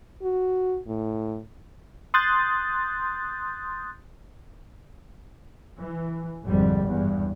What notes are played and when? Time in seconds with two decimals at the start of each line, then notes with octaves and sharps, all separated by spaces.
0.23 F#4
0.87 A2
2.14 C6 D#6 F#6 G6 A6
5.81 E3
6.45 G#1 F2 D3 G3
6.86 E2 G2